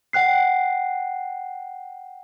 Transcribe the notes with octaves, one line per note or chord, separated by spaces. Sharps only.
F#5 G5 F#6 C7